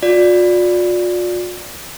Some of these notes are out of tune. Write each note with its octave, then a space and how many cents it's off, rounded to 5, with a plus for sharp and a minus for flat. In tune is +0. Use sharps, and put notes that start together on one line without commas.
F4 +45 D5 +0